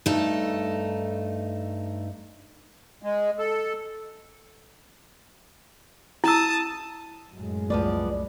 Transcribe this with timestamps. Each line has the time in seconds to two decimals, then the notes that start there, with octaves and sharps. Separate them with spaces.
0.06 G2 A3 D#4 A4
3.03 G#3
3.39 A4
6.24 E4 A5 D#6 E6
7.31 F#2 A2 G#3
7.70 C2 F3 G3 A3 B3 D5